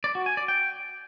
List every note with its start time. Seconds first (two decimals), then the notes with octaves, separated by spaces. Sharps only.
0.04 D5
0.15 F#4
0.26 G#5
0.37 D5
0.48 G5